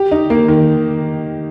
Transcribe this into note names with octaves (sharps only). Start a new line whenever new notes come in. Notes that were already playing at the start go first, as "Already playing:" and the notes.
Already playing: G4
D#4
A#3
D#3